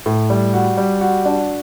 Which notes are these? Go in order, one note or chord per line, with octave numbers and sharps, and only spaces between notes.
A2
G3
F#4
G3
F#4
D4